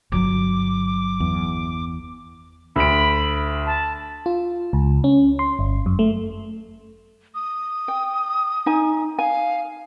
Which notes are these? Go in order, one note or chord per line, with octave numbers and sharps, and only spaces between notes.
G1 D3 F#3 D6
E2
D2 B5 D7
A5
F4
C#2
C#4
C6
G1
F#2
A3
D#6
G5
D#4 G#5
F5 G#5